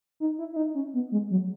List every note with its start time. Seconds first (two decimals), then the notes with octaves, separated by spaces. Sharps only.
0.20 D#4
0.38 E4
0.53 E4
0.56 D#4
0.75 C#4
0.94 B3
1.12 G#3
1.31 F#3